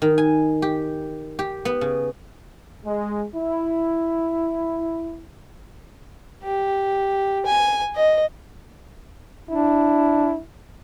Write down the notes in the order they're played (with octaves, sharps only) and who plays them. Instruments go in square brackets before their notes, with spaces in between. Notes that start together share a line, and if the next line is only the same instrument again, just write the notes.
[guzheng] D#3
G#5
G4
G4
B3
C#3
[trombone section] G#3
E4
[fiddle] G4
G#5
D#5
[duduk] D4 [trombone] E4